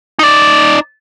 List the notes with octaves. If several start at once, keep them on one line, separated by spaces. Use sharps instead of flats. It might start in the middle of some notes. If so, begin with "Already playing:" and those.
D#4 D5